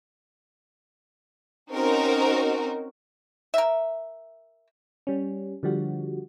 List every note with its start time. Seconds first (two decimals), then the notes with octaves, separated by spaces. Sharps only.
1.72 C4 C#4 D#4 F#4 A#4
3.54 A#4 E5
5.07 G3 C#4
5.63 D3 F3 G3 F#4